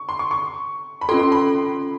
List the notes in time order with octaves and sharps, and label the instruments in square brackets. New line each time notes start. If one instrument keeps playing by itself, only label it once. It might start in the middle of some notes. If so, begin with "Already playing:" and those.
Already playing: [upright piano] C#6
C6
C#6
C#6
B5
[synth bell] A4 [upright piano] C6
[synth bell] C#4 F4
[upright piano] C6
B5